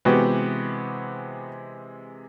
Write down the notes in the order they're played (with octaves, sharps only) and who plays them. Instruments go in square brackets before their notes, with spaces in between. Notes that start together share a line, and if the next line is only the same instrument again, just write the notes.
[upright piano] C3 E3 G#3 [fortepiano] B3 F#4 G4